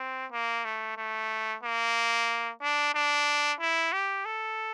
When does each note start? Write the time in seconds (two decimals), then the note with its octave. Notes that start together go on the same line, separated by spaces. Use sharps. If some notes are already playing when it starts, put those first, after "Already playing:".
Already playing: C4
0.32 A#3
0.65 A3
0.97 A3
1.63 A#3
2.61 D4
2.94 D4
3.60 E4
3.93 G4
4.25 A4